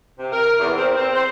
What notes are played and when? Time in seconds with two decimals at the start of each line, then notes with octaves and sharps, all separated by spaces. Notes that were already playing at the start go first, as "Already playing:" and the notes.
0.19 C3
0.31 A#4
0.59 E2
0.75 C4
0.97 C4
1.15 C5